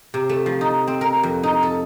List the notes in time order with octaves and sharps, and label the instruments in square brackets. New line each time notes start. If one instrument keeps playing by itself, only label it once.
[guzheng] C3
A3
F3
D#4
C4
A#4
F2
D#4
A4